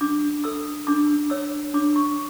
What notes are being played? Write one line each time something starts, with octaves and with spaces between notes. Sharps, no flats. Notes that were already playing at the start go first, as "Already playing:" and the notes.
D4 D6
A4 E6
D4 D6
C#5 E6
D4 D6
C#6